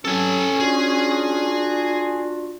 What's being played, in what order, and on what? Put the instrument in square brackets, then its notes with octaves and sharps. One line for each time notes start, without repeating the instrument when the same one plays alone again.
[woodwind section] F#3 C4 [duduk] C#4 [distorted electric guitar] A4 G#5
[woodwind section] D4 F4 F#4 [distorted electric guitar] G#4